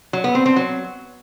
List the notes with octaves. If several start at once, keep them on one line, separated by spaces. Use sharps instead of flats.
F#3
B3
C4
C4
F#3